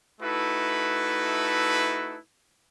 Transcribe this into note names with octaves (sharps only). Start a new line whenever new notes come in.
A3 D#4 E4 F#4 A4 B4